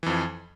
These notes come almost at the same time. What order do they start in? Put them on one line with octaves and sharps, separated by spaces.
E3 F2 F3